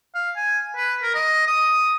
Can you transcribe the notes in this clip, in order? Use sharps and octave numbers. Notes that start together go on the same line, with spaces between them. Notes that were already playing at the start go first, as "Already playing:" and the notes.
F5
G#5
B4
A#4
D#5
D#6